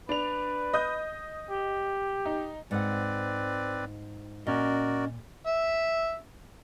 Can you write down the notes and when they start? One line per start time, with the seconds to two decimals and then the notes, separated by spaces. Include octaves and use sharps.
0.09 D4 B4 F7
0.74 D#5 D#6 G6
1.50 G4
2.25 D#4
2.71 G#2 C4 B4 D5 F#5
4.47 A#2 C#4 F#4 A#4 D5 D#5
5.46 E5